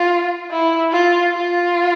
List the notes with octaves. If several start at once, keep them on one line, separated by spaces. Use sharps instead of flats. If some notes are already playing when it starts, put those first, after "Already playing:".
Already playing: F4
E4
F4
F4